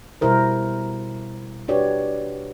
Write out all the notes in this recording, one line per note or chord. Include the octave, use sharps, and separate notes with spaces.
B2 G3 E4 A#4 C5
D4 F#4 G4 B4 C#5 D5